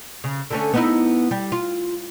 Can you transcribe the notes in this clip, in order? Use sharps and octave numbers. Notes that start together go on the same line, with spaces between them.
C#3
D3 A3 C#4
B3 D#4 E4
G3
F4